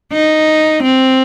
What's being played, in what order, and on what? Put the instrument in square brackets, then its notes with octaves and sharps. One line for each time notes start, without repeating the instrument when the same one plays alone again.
[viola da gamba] D#4
C4